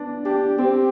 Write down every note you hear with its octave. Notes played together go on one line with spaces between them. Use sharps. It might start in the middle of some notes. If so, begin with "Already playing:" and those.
Already playing: B3 D4
D4 G4
C4 G4